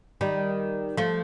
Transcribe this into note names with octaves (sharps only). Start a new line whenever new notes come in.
D#3 G3
F3 A3